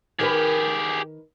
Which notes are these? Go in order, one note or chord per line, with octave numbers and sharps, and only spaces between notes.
D#3 G4 G#4 A#4 B4